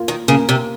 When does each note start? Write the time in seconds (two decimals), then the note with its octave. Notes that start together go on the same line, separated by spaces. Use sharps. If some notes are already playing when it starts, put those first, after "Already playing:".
Already playing: A#3 F4
0.08 D#3
0.28 C#3 A#3
0.49 C3